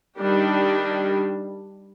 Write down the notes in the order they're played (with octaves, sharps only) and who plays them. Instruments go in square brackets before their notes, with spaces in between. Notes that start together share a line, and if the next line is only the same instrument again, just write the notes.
[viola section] D#3 G3 D4 G4